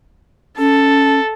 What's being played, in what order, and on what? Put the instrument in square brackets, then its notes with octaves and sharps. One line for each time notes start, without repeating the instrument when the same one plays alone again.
[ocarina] C#4 [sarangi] A4